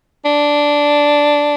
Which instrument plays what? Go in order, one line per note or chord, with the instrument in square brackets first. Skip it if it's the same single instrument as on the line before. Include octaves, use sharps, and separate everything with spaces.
[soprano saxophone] D4